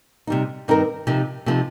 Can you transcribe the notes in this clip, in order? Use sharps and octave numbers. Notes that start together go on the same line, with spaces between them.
C3 G3 D#4
G2 D#3 C4 D#4 A#4
C3 F3 C4 D#4
C3 F3 C4 D#4